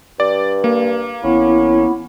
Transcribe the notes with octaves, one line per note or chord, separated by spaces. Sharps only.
G2 D5
A#3
A1 B3 C#4 E4